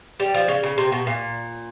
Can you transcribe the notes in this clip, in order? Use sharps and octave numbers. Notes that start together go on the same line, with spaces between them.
G3
F3
C#3
C#3
C3
B2
A#2